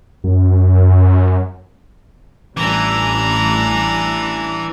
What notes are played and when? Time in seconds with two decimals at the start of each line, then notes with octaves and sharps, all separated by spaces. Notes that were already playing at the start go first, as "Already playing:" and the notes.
0.24 F#2
2.57 A1 E3 G3 D4 A#5